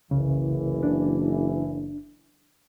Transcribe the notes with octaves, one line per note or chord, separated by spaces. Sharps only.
F#1 C2 C#3 E3
D4